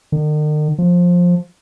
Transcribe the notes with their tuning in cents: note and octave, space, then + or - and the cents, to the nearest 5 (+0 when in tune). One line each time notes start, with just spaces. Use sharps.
D#3 -45
F3 +15